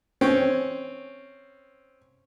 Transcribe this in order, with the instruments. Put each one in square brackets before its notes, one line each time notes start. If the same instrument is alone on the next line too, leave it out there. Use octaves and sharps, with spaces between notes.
[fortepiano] C4 C#4